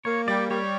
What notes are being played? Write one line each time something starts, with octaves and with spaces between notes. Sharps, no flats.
A#3 C#5
G3 D5
G3 C#5